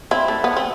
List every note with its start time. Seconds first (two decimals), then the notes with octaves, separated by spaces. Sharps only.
0.11 C4 E4
0.28 A3
0.44 B3
0.57 C4